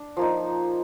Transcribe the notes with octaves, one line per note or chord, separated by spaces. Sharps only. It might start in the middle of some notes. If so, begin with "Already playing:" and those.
Already playing: D4
F3 A#3 D#4